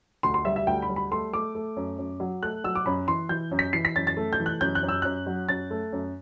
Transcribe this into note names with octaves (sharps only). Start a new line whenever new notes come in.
D2 C6
C6
G3 E5
E5
D2 G5
B5
G3
B5
A3 C6
A3 D6
A3
F#2
F#2
F#3
A3 F#6
F#3 E6
D6
F#2 B5
E3 C6
E3 G6
F#2
B6
E3 C7
B6
F#2 A6
A6
A3
G6
E3
F#6
F#2 G6
F#6
F#2
E6
F#2 F#6
F#3
F#2 A6
A3
F#2